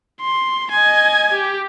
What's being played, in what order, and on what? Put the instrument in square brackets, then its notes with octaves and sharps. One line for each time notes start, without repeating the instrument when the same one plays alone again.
[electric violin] C6
D#5 G#5
G4